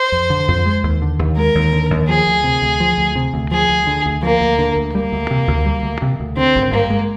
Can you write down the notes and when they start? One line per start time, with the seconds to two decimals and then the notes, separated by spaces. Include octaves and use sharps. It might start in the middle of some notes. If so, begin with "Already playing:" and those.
Already playing: C5
0.12 F2
0.30 D3
0.48 F2
0.66 G#3
0.83 D#2
1.02 D3
1.19 D#2
1.37 G#3 A#4
1.55 D#2
1.73 D3
1.90 D#2
2.09 F3 G#4
2.27 D2
2.44 C3
2.62 D2
2.80 F3
2.98 D2
3.16 C3
3.34 D2
3.52 F3 G#4
3.69 D2
3.87 D3
4.06 D2
4.23 F3 A#3
4.41 D2
4.59 D3
4.76 D2
4.94 G3 A#3
5.12 D2
5.31 C3
5.48 D2
5.65 G3
5.83 D2
6.02 C3
6.20 D2
6.37 D3 C4
6.55 G#1
6.73 G2 A#3
6.90 G#3